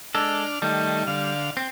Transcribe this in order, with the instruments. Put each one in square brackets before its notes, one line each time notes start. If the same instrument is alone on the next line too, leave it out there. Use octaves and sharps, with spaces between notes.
[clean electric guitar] G#3 A4 [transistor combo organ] D4 F6
[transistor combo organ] D#3 A3 [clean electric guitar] G3
[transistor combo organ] D3 F5
[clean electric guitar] C4